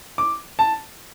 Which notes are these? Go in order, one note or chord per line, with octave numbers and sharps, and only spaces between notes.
D6
A5